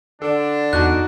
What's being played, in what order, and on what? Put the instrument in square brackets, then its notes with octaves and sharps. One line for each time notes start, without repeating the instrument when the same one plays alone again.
[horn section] D3 D4 [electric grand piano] A4
[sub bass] E2 [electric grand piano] D#4 F#4 A5 [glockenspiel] F#6